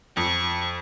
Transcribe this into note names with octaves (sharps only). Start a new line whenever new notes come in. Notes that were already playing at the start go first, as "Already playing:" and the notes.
F2 C#6